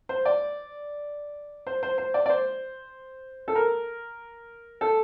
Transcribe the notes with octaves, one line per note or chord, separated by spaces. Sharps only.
C5
D5
C5
C5
C5
D5
D5
C5
A4
A#4
A4